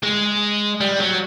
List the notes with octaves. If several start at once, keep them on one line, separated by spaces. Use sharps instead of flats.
G#3
G3
F#3